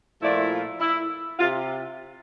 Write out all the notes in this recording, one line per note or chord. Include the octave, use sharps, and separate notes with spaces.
A#2 F3 A3 E4 D5
F4
E4
C3 F4